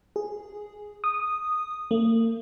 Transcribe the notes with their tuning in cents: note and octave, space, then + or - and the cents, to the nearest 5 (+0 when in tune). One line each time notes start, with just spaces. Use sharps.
G#4 +0
D#6 -10
A#3 -45